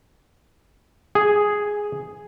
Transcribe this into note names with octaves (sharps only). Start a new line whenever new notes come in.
G#4